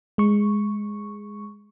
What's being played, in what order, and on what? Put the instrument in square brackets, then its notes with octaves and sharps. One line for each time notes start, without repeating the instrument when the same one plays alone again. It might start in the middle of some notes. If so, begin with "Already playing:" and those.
[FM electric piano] G#3 C#6